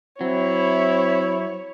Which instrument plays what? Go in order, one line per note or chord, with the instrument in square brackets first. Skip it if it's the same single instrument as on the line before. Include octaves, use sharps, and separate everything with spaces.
[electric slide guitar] F#3 [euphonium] C4 [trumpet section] E4 [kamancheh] C#5